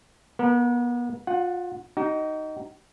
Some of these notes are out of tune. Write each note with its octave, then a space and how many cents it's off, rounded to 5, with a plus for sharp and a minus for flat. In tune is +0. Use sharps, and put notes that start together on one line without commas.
B3 -35 A#4 -10
F4 +30 F#5 +0
D#4 +0 F#4 +45